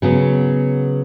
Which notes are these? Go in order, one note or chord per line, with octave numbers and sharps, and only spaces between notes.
C#3 F#3 B3